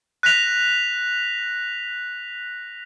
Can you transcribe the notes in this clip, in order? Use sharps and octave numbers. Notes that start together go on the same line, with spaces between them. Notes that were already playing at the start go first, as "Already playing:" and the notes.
F#6 A#6 B6 F7